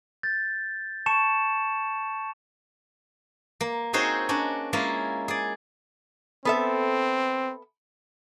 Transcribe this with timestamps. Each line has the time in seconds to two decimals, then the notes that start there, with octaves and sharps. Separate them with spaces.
0.23 G6 A6
1.06 A5 C#6 C#7 E7
3.61 A#3
3.93 C4 D#4 F#4 G#4 C5 C#5
4.29 C#4 D4 F#4
4.73 G#3 A#3 C#4 E4 F4
5.28 G#4 D5
6.45 B3 C4 A4 E5